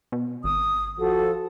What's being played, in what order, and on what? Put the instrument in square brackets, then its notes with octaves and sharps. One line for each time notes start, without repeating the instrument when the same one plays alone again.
[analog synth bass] B2
[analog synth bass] G#1 [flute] D#6
[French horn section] F3 F#4 [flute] A4